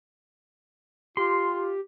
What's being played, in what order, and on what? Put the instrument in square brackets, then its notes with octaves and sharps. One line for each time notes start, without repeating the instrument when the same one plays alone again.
[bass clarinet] F4 [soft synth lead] G4 [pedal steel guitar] C6